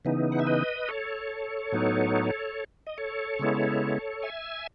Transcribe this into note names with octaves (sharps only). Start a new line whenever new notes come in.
C#3 E3 B3 D#4
F#5
E5
B4 D#5
A4 C#5
A2 F#3 B3 D#4
D#5
A4 C#5
C#3 G#3 B3 E4
E5 G#5